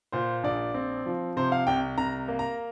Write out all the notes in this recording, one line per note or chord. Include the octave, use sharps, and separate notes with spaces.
A#2 C5
A#1 D5
C4
F3
C3 C5
F5
C2 G5
C2 A#5
A#3
A#5